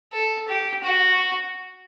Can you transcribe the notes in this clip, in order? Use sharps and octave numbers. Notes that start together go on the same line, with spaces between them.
A4
G4
F#4